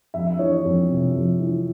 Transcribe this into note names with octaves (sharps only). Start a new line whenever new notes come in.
F2 E5
E5
E3 C#5
C#5
F2
C3
F2
E3